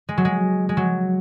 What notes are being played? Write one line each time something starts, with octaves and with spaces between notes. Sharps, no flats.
G#3
F#3
G#3
G#3
F#3